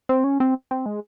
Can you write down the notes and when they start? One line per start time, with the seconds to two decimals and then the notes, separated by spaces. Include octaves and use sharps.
0.09 C4
0.24 C#4
0.40 C4
0.71 C4
0.86 G#3